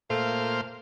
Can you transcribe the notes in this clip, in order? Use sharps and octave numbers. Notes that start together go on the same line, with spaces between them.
A#2 A3 C5 F5